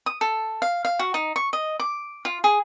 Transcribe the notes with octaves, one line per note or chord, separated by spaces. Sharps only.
D#6
A4
F5
F5
F#4
D#4
C#6
D#5
D6
F4
G#4